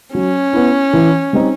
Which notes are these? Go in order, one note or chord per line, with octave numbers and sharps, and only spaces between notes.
F#3 C#4
B3 E4
E3
G3 C4 D#4